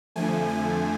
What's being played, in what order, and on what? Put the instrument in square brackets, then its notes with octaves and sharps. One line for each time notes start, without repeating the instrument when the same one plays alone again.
[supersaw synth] F2 D3 F3 A3 G#5
G#5